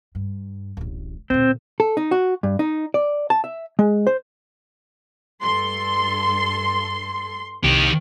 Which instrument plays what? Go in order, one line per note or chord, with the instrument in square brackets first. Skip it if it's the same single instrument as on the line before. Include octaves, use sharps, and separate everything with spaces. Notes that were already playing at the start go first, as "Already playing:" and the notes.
[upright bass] G2
D1 A1
[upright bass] D2 A#2 [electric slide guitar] C4
[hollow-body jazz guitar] A4
D#4
F#4
G2
D#4
D5
A5
E5
G#3
C5
[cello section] G2 A4 [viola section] C6
[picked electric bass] C2 [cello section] F2 F3 [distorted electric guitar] D#3 G4